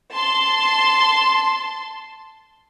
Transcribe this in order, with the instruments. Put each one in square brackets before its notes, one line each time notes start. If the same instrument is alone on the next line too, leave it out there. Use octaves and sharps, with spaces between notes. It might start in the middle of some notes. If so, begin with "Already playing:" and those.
[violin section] A5 C6